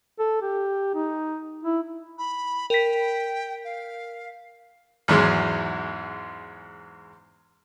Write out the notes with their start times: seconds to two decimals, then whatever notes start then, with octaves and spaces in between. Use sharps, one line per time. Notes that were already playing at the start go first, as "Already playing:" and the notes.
0.19 A4
0.42 G4
0.95 D#4
1.63 E4
2.18 B5
2.70 A#4 G5 B6
3.65 F5
5.08 E2 G#2 F#3 G#3